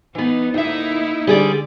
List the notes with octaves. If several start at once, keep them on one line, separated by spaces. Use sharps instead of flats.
E3 B3 D#4
D2 A#3 D#4 E4 E5
D3 G3 G#4 D5